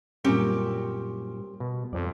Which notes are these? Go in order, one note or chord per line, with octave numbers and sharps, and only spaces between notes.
F#2 A#2 G3 C4 C#4 G4 A#4 G#5
B2
F2 F3 D5